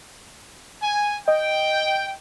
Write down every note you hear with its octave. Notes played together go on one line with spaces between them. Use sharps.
G#5
D#5 G5